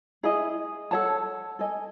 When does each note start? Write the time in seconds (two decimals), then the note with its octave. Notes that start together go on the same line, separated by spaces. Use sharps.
0.23 E4 G#4 D#5
0.91 A4 C#5 F#5 A5
1.59 A4 D#5 G#5